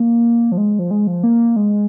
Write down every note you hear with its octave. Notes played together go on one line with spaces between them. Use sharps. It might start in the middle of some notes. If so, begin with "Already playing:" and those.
Already playing: A#3
F3
G#3
F3
G#3
F3
A#3
G#3